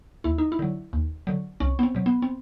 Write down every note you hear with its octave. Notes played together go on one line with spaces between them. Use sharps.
D#2 E4
D#4
E4
D3 F#3
D#2
D3 F#3
C2 C#4
B3
C4
B2 F#3
B3
C4